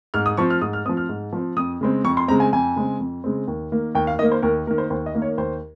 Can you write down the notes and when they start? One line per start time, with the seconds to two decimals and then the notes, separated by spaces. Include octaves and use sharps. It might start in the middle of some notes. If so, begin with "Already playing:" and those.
0.14 G#2 F6
0.26 D#6
0.37 F3 C4 C#6
0.50 F6
0.61 G#2 D#6
0.73 F6
0.85 C4 D#6
0.89 F3
0.97 F6
1.09 G#2
1.33 F3 C4
1.56 F2 D#6
1.81 C#3 G#3 C4
2.04 F2 C#6
2.17 C6
2.28 C#3 G#3 C4 A#5
2.40 G#5
2.53 F2 G#5
2.76 C#3 G#3 C4
2.99 F2
3.24 C#3 G#3 C4
3.47 D#2
3.72 D#3 A#3
3.95 D#2 G5
4.07 F5
4.19 D#3 D#5
4.22 A#3
4.32 C5
4.43 D#2 A#4
4.67 A#3 A#4
4.71 D#3
4.78 C5
4.90 D#2 C5
5.06 D#5
5.15 D#3 A#3
5.22 C#5
5.38 D#2 C5